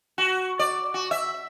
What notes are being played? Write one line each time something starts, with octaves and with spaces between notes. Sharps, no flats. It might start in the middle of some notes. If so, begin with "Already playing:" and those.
F#4
D5
F#4
E5